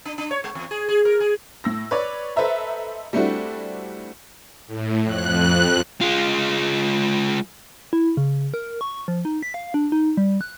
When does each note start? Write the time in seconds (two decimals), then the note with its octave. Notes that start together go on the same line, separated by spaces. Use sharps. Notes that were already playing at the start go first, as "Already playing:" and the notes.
0.05 D4
0.18 D4
0.31 C#5
0.44 G#3
0.55 E2
0.71 G#4
0.89 G#4
1.05 A#4
1.20 G#4
1.64 A2 E6 A#6
1.91 B4 C#5 D5
2.36 A4 B4 C5 D#5 E5 A#5
3.13 G3 A3 C4 D4 E4 F#4
4.67 A2
5.04 F2 F#6
6.01 G#3 F4
7.93 E4
8.17 C#3
8.54 A#4
8.81 C#6
9.08 F3
9.25 D#4
9.43 B6
9.54 F5
9.74 D4
9.92 D#4
10.17 G3
10.41 F#6